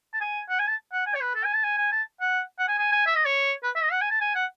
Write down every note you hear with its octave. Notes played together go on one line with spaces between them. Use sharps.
A5
G#5
F#5
G#5
A5
F#5
G#5
C#5
B4
A4
G#5
A5
G#5
G#5
A5
F#5
F#5
G#5
G#5
G#5
E5
D#5
C#5
B4
E5
D#5
F#5
G#5
A5
G#5
F#5